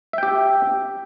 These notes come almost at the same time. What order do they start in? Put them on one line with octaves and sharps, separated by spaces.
E5 G5 G4